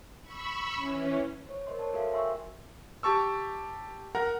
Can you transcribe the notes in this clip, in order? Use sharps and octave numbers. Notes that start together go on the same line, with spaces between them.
B5 C#6 E6
E3 C#4
C5 C#5
A#4 C5 D#5 C6
A#4 C#5 D5 A5
F#4 A4 A#4 C5 E5 F5
E5 G5 G#5 C6 C#6 E6
G4 A5 C#6 E6
A#4 F#5 A#5